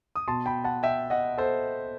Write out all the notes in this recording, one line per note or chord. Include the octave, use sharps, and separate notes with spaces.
D#6
B2 A5 C6
G5 B5
F#5 A5
E5 G5
D#5 F#5
A4 C5